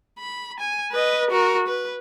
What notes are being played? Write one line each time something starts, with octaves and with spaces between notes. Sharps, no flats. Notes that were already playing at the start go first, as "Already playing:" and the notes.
B5
G#5
B4 D#5
F#4 A#4
B4